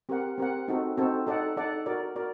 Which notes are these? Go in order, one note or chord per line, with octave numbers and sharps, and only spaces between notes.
C4 G4 A#4 F#5
C4 G4 A#4 F#5
C4 D#4 F#4 A4
C4 D#4 F#4 A4
D#4 A4 D5 F#5
D#4 A4 D5 F#5
F#4 A#4 D5
F#4 A#4 D5